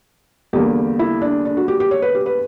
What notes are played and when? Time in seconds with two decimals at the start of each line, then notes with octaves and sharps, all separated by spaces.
0.53 E2 D3 G3 A#3 G4
0.99 E4
1.22 D4
1.45 D4
1.57 F#4
1.68 G4
1.80 G4
1.91 C#5
2.02 B4
2.15 G4
2.26 B4